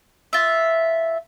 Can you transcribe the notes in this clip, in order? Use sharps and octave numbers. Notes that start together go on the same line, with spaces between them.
F4 E5